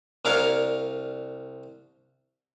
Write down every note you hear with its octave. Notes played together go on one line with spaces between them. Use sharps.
C2 D4 A#4 C#5 F5